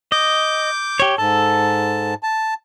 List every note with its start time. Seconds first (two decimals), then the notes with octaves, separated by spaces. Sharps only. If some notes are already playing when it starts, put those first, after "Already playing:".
0.12 D#5 D6 G6
1.00 G4 C#5
1.18 G#2 A4 A5
2.23 A5